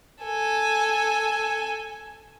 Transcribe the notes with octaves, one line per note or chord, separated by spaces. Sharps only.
A4 G#5